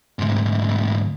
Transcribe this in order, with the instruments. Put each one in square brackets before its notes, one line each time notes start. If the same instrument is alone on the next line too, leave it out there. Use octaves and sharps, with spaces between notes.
[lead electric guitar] D2 G#2